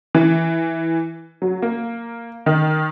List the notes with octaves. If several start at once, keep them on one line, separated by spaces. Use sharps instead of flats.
E3
F#3
A#3
D#3